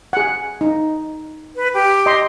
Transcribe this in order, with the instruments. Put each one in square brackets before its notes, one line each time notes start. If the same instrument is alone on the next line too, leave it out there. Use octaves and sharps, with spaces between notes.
[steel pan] G#4 F#5
D#4
[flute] B4
G4
[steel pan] D#5 C6